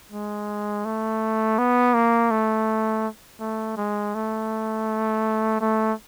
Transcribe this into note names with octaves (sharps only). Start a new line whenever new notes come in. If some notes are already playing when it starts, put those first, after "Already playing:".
G#3
A3
B3
A#3
A3
A3
G#3
A3
A3